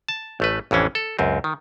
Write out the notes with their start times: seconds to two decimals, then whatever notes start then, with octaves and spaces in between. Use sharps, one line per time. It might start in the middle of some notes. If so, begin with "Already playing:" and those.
0.09 A5
0.40 A1 A3 B4
0.71 A1 F2 E3 C#4 D4
0.95 A4
1.19 C#2 F#2 C4
1.44 D#3